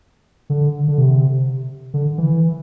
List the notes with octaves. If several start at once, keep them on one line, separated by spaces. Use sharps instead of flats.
D3
D3
C3
D3
E3